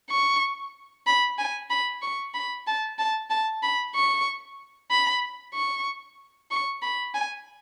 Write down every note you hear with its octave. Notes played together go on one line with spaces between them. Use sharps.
C#6
B5
G#5
B5
C#6
B5
A5
A5
A5
B5
C#6
B5
C#6
C#6
B5
G#5